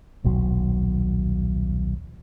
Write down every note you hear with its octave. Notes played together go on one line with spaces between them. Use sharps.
D#1 B1 F#3